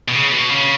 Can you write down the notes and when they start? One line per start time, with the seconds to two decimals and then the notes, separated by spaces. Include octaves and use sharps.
0.08 B2
0.14 C#3
0.32 B2
0.49 C#3